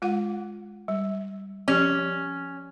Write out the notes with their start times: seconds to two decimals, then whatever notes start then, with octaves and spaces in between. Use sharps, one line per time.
0.02 G#3 F4 F#5
0.88 G3
1.68 F3 C#4 G4